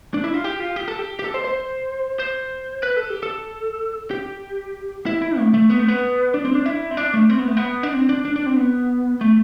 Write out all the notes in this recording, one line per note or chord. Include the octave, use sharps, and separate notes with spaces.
D4
E4
F4
G4
F4
G4
A4
G4
G4
A4
C5
C5
C5
B4
A4
G4
A4
G4
E4
E4
A3
A3
B3
A3
B3
D4
C4
D4
E4
C4
D4
A3
C4
B3
A3
B3
D4
C4
D4
D4
D4
C4
B3
A3